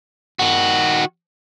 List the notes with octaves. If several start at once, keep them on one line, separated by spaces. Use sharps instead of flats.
D#3 F#4